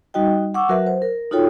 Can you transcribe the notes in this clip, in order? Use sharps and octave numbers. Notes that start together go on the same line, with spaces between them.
G3 D#4 F#4 D#5 G5
F#5 C#6 D6 E6
F#3 F#4 A#4 B4 E5 F#5
C5
A#4
D#4 F4 F#4 A4 C#5 G5